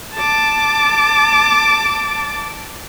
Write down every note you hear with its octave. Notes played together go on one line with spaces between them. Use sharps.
A5 D6